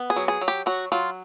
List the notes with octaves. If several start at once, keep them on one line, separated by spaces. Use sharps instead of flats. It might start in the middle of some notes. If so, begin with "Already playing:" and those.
Already playing: B3
G#4
F#3
G#4
F#3
G4
F#3 F#4
F#3 F4